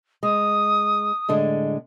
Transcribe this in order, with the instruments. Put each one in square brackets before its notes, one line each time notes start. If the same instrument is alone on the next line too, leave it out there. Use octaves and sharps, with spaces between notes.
[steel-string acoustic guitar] G#3 [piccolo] D#6
[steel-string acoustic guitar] A2 D3 G#3